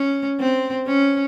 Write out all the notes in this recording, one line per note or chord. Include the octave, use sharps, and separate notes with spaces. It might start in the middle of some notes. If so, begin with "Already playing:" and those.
Already playing: C#4
C4
C#4